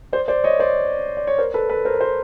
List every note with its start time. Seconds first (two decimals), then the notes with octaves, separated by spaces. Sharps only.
0.13 C5 D5
0.28 C5 D5
0.44 C#5 D#5
0.60 C5 D5
1.17 D5
1.27 C#5
1.38 A#4 C5
1.54 A4 B4
1.69 A4 B4
1.85 A#4 C5
1.95 B4
2.01 A#4 C5